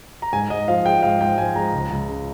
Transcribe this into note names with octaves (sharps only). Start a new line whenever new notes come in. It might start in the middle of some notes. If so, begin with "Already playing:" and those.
A#5
G#2 G#5
G#2 D#5
F3 F5
G#3 G5
G#2 F5
G#2 G5
F3 G#5
G#3 A#5
C#2
C#2
C#3